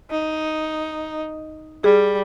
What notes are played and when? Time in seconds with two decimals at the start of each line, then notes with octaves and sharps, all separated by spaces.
0.11 D#4
1.84 G3 G#4